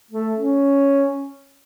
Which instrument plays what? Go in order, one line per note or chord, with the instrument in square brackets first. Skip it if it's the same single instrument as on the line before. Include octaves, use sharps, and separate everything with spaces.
[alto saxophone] A3
C#4